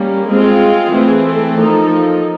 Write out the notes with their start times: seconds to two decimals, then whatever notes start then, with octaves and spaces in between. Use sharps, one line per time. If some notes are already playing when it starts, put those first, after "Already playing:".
Already playing: G3 A#3 C#4
0.28 G#3 C4 F4 G#4
0.93 E3 A3 C4
1.25 A4
1.57 F3 A#3 D#4